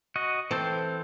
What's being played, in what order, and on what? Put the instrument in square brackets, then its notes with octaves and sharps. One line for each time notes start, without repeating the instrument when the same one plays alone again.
[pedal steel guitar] F#4 D#5
[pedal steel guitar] E3 A4 C5 [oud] C4